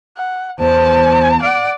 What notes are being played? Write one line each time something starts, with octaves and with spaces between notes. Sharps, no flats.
F#5
E2 C5 A5
D5 F#5